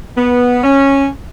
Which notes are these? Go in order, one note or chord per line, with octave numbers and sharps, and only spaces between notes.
B3
C#4